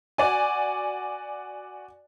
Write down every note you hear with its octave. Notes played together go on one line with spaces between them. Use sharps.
F#4 D5 G#5